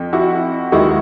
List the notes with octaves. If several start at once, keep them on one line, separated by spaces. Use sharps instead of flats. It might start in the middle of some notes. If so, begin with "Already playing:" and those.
Already playing: F2
E4 F#4
D#2 D#3 G#3 E4 F#4